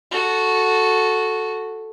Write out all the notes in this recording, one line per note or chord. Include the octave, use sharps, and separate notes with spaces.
F#4 A4